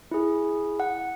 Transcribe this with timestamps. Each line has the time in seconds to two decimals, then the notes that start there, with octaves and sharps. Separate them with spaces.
0.11 E4 G#4
0.80 F#5